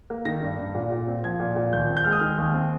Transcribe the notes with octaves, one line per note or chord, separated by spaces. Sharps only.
A#3
D#3 A#6
G2
G2
A#2
A#2
C4
F3 G#6
A#2
A#2
D#2 G6
C4
G6
G#3 F6
D#6
D#3 F6
D#2
C4